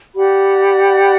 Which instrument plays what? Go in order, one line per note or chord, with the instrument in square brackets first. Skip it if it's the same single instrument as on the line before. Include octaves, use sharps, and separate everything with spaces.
[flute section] G4 D5 F#5 B5